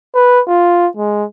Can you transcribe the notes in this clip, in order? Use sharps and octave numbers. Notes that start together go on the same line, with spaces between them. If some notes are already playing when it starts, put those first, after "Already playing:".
B4
F4
G#3